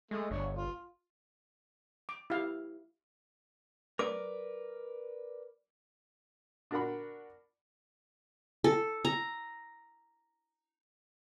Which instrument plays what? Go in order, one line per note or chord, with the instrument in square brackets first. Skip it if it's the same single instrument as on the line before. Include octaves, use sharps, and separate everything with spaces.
[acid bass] G#3 [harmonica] A3
[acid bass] G1 [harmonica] D4 C#5
[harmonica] F4
[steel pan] D6
E4 G4 F5
[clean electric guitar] A#4 B4 D5 [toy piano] D6
[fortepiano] D4 F#4 A#4 D5 F#5 B5
[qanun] A4
A#5